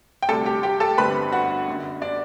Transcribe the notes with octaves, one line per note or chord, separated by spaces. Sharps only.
G5
D2 C3 G3 A4 A5
G4 G5
G4 G5
A4 A5
G1 G2 D3 G3 C4 B4 B5
F#4 F#5
F#1 F#2 D3
D4 D5